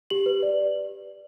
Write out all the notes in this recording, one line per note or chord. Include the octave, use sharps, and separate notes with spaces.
G4 F#7
B4
D5